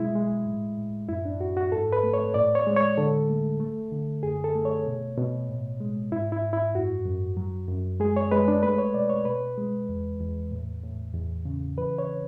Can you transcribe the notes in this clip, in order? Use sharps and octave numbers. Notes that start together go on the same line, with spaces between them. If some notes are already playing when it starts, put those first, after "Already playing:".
Already playing: B2 F#3 G#3 E4
G#3
A2
A2
F#2 E4
D4
F#2 F#4
F#4
G#2 A4
B4
A3
C#5
A2 D5
C#5
G#3
C#5
D3 A4
A3
A3
D3
F#2 G#4
A4
A3
C#5
B2
B2
A2
G#3
G#2 E4
E4
G#2
E4
F#2 F#4
F#2
F#3
F#2
G#3 G#4
C#5
G#3 B4
D4
A3 B4
C#5
B2 D5
C#5
B2 B4
G#3
E2
E2
A2
A2
E2
C#3
E3 B4
C#5